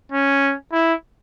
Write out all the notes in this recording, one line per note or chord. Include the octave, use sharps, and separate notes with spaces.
C#4
E4